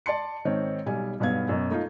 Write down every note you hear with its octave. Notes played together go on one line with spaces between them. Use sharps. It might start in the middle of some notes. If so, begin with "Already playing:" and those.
D5 A5 C6 C#7
G#2 D#3 C4 C#5
B1 G3 G#5
B1 G2 B3 F5 G#6
F#2 B2
A3 D#4 F4